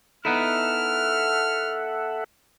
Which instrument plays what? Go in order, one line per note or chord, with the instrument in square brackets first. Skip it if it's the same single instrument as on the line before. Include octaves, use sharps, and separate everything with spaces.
[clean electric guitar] B3 D#4 E4 [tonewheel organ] A4 E5 F#5 [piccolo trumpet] F6